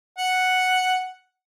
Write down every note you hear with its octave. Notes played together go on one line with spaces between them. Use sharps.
F#5